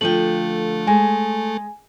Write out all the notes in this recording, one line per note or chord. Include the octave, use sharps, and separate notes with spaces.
D3 F3 A3 G5 F#7
G#3 G#5